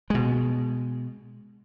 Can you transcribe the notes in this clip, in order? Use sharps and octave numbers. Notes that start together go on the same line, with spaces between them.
B2 G#3